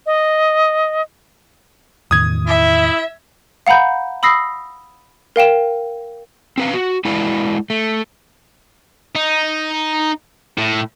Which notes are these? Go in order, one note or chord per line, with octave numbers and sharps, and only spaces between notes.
D#5
E2 A2 D#3 D#6 G#6
E4 E5
F5 F#5 A#5 B5 G6
B5 D#6 E6 A#6 C7
A#4 F5 G5 E7
C4 B4 F5
F#4
G#3 E4 B4 D5 F5
A3
D#4
A2